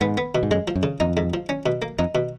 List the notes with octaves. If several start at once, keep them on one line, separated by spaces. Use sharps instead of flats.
G#2 B3
B3
B2
G#2
F#2 G#3
F3
F#2
C#3
F2 D#4
G#2
F3
C#4
B2
A#3
F2 D#4
B2